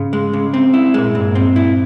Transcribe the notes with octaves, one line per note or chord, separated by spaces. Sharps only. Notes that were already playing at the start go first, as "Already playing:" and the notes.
Already playing: G#2 C#3
G#3
C#3
C4
E4
A#2 G#3
G#2
G2 A#2
C4
E4